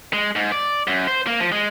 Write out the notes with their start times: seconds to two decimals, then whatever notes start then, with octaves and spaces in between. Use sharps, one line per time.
0.13 G#3
0.36 G#2
0.52 D5
0.87 F#2
1.08 C5
1.27 A#3
1.40 F3
1.52 G#3